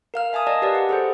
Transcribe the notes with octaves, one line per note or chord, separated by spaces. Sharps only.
A#4 F5 F6
E5 G#5 A5 D#6
A#4 D5 D#5 F5 A5
G4 B4 D5
F#5
G#4 A4 C5